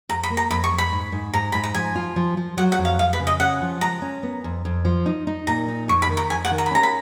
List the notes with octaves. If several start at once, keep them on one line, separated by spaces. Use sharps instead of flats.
F2 A#5
B5
A#3
A#5
F2 B5
C#6
F2
B5
G#2
G#2
G#2 A#5
G#2 B5
A#5
F3 G#5
F4
F3
F3
F#3 F#5
F#5
F2
F5
F2 F5
B4
C#3
D#5
C#4 F#5
F3
G#3 A#5
C#4
B3
F2
F2
F3
D#4
D#4
A#2 A#5
D#4
F2 C#6
B5
D#3
A#5
F2 G#5
F#5
D#3
A#5
B5
C#4 A#5
B5